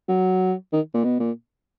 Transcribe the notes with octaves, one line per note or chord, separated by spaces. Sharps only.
F#3
D#3
A#2
B2
A#2